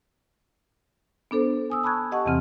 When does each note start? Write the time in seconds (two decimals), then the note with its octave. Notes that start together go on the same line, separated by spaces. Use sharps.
1.31 B3 D4 A4 C5
1.70 G#5 D#6 E6
1.84 A5 B5 C#6 F#6 G#6
2.11 G4 D#5 F#5 A5 C#6
2.25 E2 C3 E3 C4 F6